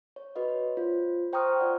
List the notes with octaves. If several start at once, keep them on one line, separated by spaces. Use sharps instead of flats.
C#5
F#4 B4 C#5 D#5
F4 C5
C5 G5 A#5 C#6 D#6 F6
F4 D5 F#5